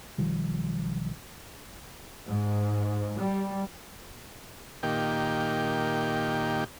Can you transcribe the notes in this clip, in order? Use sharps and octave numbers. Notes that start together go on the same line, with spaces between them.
B1 D#3 F3 G3
G#2
G3
A#2 D#3 G4